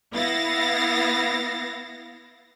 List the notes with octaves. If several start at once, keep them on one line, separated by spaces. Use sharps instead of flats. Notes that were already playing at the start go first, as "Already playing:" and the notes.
B3 E4 F5 A6 A#6